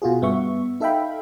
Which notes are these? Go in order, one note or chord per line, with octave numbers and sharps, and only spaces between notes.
B2 F4 F#4 G#4
G2 B3 E5 C#6
D#4 A4 E5 F5 G5 B5